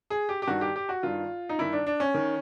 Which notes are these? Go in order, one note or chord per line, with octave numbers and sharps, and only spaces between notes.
G#4
G4
G4
G2 D#3 F#4
G4
G4
F#4
G2 D#3 F4
D#4
G2 D#3 E4
D4
D4
C#4
D#3